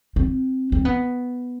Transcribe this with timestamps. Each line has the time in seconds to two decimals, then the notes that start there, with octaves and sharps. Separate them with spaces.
0.16 C4
0.72 C4
0.85 B3